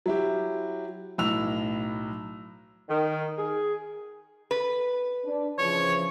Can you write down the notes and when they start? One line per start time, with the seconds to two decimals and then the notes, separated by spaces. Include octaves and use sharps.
0.06 F#3 E4 G4
1.18 B1 A2 E6 F7
2.88 D#3
3.37 G#4
4.51 B4
5.25 D4
5.58 C#3 E3 F3 C#5